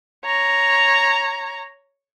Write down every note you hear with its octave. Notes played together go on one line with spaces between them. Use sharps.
C#5 A#5